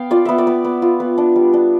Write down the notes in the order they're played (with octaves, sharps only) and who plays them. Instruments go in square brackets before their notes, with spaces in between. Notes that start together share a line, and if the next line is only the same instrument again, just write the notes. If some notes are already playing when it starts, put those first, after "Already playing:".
Already playing: [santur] B3 F5 G5
F4 D5
B3 E5
D5
B3
B3
F4
B3
D4
G3
D4